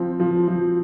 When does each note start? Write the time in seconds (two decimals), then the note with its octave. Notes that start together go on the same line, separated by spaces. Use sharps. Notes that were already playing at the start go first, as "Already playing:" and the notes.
Already playing: F3 C4
0.20 F3
0.48 F3